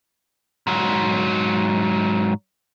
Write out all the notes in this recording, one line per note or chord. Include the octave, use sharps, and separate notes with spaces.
G#2 F#3